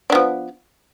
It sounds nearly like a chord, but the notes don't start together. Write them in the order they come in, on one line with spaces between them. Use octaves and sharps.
D4 B3 F3